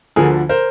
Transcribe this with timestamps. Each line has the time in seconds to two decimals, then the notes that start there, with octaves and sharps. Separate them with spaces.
0.16 D2 D3 F3 G#4 A#4
0.49 A#4 C5